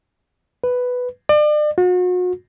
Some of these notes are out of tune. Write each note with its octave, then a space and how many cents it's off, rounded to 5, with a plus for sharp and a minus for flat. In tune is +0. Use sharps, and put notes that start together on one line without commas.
B4 +5
D5 +35
F#4 -40